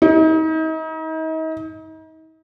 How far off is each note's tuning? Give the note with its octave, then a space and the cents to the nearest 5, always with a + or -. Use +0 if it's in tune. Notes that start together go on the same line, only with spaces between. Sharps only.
D#4 +40